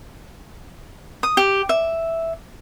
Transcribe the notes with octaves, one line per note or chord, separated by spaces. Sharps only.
D#6
G4
E5